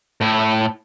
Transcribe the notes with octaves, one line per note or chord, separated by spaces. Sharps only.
A2 E4